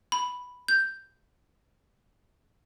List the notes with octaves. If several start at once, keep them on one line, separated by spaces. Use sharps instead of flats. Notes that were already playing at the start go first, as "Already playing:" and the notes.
B5
G6